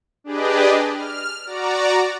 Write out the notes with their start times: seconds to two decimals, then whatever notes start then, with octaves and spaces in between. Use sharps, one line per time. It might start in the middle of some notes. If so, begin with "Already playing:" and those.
0.24 D4 G4 G#4 B4 D5 D#5
0.92 F6
1.46 F#4 D5 A#5